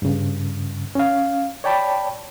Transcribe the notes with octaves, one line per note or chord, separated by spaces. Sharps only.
G2 C#3
C#4 F5
C#5 D5 G5 A5 B5